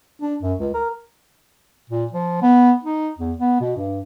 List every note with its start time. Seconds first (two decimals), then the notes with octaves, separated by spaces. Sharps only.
0.21 D4
0.42 F#2
0.60 C#2
0.74 A#4
1.90 A#2
2.13 F3
2.42 B3
2.83 D#4
3.18 E2
3.38 B3
3.61 B2
3.77 G2